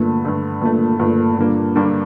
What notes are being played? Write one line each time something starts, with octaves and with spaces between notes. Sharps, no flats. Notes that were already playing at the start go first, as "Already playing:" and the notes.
Already playing: G2 A#2 D3 A3
G2 D3 A3
G2 A#2 D3 A3
G2 A#2 D3 A3
G2 A#2 D3 G3 A#3 D4
G2 D3 G3 A#3 D4